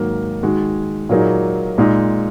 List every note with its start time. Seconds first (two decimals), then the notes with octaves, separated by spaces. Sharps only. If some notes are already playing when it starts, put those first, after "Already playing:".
Already playing: G#2 D#3 F#3 A#3
0.43 D#3 G#3 F#4
1.09 A#2 F#3 A#3 D#4 G#4
1.78 A#2 G#3 D#4